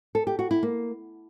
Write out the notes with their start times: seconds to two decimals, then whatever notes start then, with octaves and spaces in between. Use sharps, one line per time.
0.15 A4
0.27 G4
0.39 F#4
0.51 E4
0.63 A#3